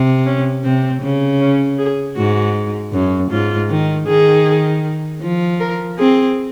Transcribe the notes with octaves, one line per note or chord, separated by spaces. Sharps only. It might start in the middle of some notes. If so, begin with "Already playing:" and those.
Already playing: C3
C#4
C3 C4
C#3
C#4
G#4
G#2 F#4
F#2
G#2 F4
D#3
D#3 G#4
F3
A#4
C4 G#4